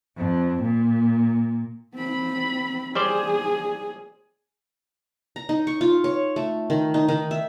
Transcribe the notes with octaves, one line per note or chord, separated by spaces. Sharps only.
F2
A#2
C4 B5
G3 G#4 C5 D5
A#5
D#4
C#6
F4
C#5
A3
D#3
D#4
D#3
E5